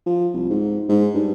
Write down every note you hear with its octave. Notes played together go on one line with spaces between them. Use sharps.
F3
C2
G#2
G#2
G2